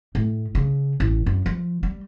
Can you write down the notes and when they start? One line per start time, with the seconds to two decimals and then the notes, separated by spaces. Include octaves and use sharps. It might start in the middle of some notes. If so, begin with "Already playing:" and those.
0.15 A2
0.55 C#3
1.00 A1
1.26 F#2
1.46 F3
1.83 G3